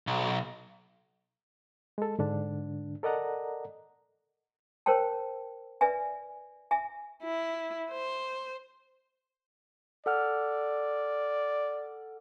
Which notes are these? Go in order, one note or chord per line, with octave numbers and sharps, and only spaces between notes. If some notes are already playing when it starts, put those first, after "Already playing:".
B1
G#3 A4
G#2 D3 D4
A4 A#4 D5 D#5 F#5 A#5
A#4 C5 C#5 G5 A5
B4 D5 E5 G#5
E5 G#5
E4
C5
A4 D5 F#5 F6